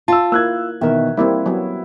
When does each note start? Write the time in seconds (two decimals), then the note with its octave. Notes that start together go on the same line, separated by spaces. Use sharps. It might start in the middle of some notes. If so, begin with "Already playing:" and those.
0.08 F4 A5 E6
0.32 A#3 E4 E6 F#6 G#6
0.81 B2 D#3 E3 A#4 E5
1.17 G3 A#3 C4 E4
1.46 F#3 B3